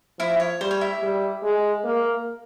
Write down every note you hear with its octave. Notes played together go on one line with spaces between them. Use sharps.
F3 E4 E5
C#5
G3 C5
C#5
E4 E5
G3
G#3
A#3